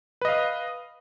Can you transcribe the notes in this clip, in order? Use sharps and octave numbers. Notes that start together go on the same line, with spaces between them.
B4 D#5 F5